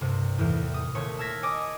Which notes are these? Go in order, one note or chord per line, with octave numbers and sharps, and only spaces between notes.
C2 G2 C3
E2 A2 E3
D#6
D#1 A#2 A3 C#5 C#6
A5 E6 F6 G#6 A#6 B6
C#5 D#5 G#5 D6 D#6